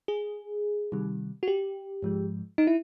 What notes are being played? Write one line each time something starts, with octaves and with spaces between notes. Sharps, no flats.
G#4
C3 D#3 G3
F#4
G4
G#2 F3 G#3
D#4
E4